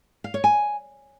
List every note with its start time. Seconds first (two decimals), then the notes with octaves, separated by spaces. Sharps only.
0.24 F5
0.34 C#5
0.44 G#5